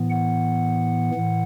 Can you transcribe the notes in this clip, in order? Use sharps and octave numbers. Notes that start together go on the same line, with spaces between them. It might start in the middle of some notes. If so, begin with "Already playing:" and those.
Already playing: A2 E3 B3
F#5
A2 E3